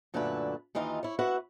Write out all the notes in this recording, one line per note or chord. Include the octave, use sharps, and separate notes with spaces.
F#2 A#2 D3 A3 E4 B4
D#2 E3 D#4 F4 F5
E4 C#5
F#4 B4 E5 F#5